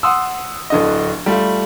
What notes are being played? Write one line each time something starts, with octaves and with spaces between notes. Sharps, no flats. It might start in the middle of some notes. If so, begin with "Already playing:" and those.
F#5 C6 D#6 E6
D1 D3 D#5
G3 A3 F4